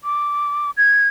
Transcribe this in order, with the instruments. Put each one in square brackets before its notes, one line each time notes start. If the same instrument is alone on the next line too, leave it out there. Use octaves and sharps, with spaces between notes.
[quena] D6
G#6